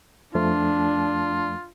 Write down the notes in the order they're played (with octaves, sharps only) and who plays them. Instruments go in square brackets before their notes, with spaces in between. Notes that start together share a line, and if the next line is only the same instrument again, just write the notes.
[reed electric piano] F2 F3 A3 [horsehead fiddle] D4 [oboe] F4